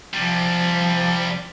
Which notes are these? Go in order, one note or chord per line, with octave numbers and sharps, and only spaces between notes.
C3 F3 G3